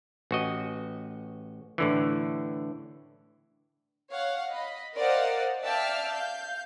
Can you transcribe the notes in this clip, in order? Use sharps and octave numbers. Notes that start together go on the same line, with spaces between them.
A1 F#4 D#5
A2 D3 E3
C#5 F5 F#5
D#5 B5
A#4 C5 D5 D#5 F5 F#5
D5 E5 F5 G5 A5 F6
F5 G6